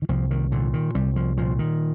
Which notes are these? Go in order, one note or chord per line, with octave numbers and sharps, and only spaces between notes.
D#3
C2 F3
D#3
A#2 D3
D#3
C2 G3
F3
A#2 F3
D#3